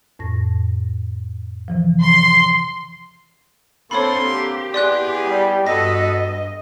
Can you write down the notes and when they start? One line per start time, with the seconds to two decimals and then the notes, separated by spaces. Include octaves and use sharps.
0.19 F2 A2 A#6
1.68 C3 E3 F3
2.02 C6
3.91 D3 A#3 C4 A4 C#5 B5 C6
4.25 G4
4.74 B3 E4 G#4 D5 C6 F#6
5.26 G3
5.67 G2 B3 F#4 A4 D#5 A#6